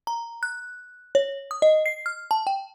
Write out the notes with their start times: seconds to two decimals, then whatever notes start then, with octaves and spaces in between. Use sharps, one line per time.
0.07 A#5
0.43 F#6
1.15 C#5
1.51 D#6
1.62 D#5
1.86 C7
2.06 F6
2.31 A5
2.47 G5